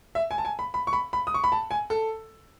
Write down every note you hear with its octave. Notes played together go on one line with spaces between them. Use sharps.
E5
G#5
A5
G#5
B5
B5
C#6
B5
B5
D#6
C#6
B5
A5
G#5
A4